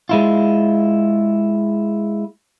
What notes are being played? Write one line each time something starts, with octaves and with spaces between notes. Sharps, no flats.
G#3 E4 F4